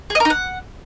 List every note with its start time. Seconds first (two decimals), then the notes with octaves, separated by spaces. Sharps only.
0.10 G#4
0.15 D#5
0.20 A#4
0.25 D#4
0.30 F#5